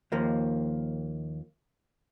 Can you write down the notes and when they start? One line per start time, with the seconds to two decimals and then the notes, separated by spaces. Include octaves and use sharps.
0.12 D#2 F3 A#3